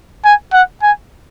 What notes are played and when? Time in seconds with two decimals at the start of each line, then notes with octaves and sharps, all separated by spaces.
0.25 G#5
0.53 F#5
0.83 G#5